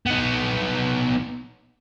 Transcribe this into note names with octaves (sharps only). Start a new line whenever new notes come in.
B3 D#4